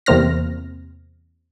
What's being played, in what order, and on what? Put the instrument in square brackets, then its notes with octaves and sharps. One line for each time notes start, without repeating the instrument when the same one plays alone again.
[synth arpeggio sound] E2 C3 A#3 C4 F6 A#6